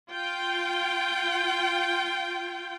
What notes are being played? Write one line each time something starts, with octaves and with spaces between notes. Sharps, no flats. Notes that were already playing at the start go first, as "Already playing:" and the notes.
F4 G5